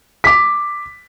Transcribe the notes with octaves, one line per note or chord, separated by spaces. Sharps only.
D6 B6